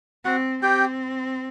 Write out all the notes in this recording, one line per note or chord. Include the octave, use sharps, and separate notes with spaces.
C4 F#4 F#5
C4 G4 G5